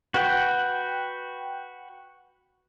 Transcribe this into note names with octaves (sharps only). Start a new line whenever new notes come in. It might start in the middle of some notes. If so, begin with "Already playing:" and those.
F#4 B4 F#5 G5